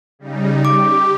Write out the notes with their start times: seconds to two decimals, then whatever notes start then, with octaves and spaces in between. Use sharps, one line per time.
0.19 C#3 G3 D#4
0.65 G4 D6